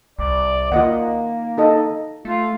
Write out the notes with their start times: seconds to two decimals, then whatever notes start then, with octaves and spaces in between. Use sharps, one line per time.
0.19 C2 D5
0.72 D#3 A#3 F4 D#5 F#5
1.57 D#4 A4 D#5
2.25 A3 F4